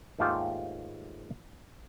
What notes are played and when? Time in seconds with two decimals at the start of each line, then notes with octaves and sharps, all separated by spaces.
0.19 D#2 G#2 A3 F4 G4